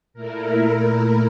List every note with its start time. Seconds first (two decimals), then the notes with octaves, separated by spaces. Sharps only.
0.14 A#2 A3 E4 A#4